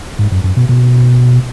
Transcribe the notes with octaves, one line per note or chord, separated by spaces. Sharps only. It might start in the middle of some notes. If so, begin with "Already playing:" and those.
G#2
F#2
F#2
B2
B2